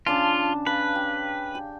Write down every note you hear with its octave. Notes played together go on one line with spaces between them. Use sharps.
C#3 D4 F4 A5
B4 F5 A5
G4
G4